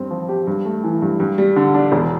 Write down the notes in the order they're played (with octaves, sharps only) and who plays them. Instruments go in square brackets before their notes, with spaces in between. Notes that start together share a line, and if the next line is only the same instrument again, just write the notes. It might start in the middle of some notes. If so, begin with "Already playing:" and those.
Already playing: [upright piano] G2 C4
F3
G4
G2
A3
E3
G2
G2
G3
D3
D4
E1